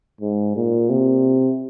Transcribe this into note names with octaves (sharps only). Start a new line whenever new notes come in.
G#2
A#2
C3